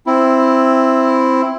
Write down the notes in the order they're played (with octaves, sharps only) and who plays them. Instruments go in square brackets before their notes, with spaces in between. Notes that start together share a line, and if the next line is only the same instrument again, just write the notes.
[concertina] C4 E4